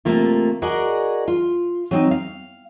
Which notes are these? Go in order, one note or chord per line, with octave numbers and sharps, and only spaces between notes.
C3 A3 A#3 F4
F#4 G#4 A#4 D5 D#5 F#5
F4
F#3 C4 D#4
F5